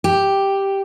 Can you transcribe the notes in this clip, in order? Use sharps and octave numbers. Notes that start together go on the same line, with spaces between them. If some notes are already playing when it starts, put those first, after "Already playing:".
G4